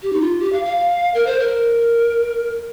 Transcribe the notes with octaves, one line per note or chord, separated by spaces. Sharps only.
G4
D#4
F4
G4
F5
F5
A#4
C5
A#4